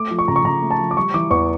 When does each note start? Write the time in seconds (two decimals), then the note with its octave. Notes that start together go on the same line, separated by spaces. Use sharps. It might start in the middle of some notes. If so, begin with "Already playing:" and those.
Already playing: A3 D6
0.11 F3
0.19 C#6
0.28 C#3 A#5
0.36 C#6
0.44 C#3 A#5
0.62 A3
0.71 A5
0.79 F3
0.91 D6
0.96 G3 C#6
1.14 E3 D6
1.31 E2 C#6